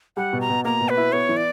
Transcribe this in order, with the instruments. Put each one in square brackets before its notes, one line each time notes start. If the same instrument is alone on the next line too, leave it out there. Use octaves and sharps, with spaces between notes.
[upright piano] G3 [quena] F#5
[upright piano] B2
[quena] A#5
[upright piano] B2
[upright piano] A#3 [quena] A#5
[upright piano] B2
[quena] B4
[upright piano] E4
[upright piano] B3 [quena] C#5
[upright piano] E3
[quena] D5